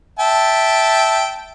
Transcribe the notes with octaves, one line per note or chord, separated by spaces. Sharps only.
E5 G5 A5